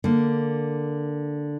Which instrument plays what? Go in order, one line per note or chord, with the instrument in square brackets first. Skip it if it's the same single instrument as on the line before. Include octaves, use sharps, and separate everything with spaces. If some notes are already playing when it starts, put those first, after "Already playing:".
[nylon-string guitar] D3 A#3